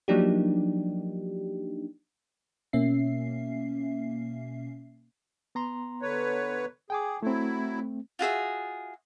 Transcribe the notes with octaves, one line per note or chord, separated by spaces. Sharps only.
F3 F#3 A#3 D4 D#4 G4
B2 A#3 C#4 E5 C7
B3 A#5 C6
D3 B4 C#5
G#4 G5 G#5 D6
F#3 A3 C4 E4
F4 F#4 G#4 E5